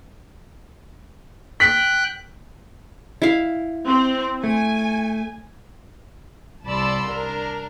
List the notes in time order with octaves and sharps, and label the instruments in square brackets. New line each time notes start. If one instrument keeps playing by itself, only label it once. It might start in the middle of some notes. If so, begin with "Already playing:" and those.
[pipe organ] G5 F#6 [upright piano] B6
[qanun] E4 F5
[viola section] C4
[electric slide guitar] A3 [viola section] G#5
[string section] C2 D5 A5 B5 C6 E6
D4 A#4